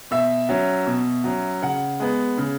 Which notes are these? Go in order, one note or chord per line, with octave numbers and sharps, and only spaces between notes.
B2 E5
F#3 C#4
B2
F#3 C#4
C#3 F#5
G#3 B3
C#3